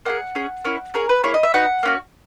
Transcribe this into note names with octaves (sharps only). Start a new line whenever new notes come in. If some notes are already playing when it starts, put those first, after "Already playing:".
A#3 E4 G#4 F#5
C#4 G#4
A#3 C#4 E4
C#4 G#4 A#4
B4
A#3 E4 G#4 C#5
D#5
E5
B3 D#4 F#4 F#5
A#3 C#4 F#4